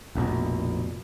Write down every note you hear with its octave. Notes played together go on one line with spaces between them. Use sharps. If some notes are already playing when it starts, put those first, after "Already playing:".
F1 A#1 B2